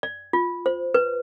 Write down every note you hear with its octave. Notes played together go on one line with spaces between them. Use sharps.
D5
F4
C5
B4